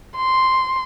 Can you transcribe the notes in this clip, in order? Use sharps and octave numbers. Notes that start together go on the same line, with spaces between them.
C6